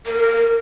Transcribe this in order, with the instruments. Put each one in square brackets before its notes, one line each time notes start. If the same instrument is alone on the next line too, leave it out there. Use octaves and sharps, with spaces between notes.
[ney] A#4